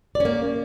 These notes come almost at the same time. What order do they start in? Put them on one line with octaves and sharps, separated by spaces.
D5 C#4 A#3